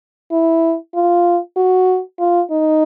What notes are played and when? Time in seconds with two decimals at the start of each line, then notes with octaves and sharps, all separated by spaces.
0.31 E4
0.95 F4
1.56 F#4
2.19 F4
2.51 D#4